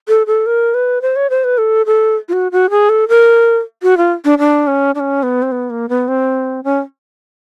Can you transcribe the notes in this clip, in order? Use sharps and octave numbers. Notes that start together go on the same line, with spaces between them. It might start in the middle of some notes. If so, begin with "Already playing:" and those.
A4
A4
A#4
B4
C5
C#5
C5
B4
A4
A4
F4
F#4
F#4
G#4
A4
A#4
F#4
F4
D4
D4
C#4
D4
C#4
B3
C4
B3
A#3
B3
C4
C#4